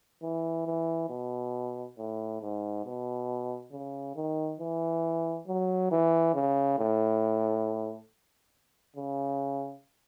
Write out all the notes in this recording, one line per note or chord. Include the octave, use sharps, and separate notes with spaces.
E3
E3
B2
A2
G#2
B2
C#3
D#3
E3
F#3
E3
C#3
A2
C#3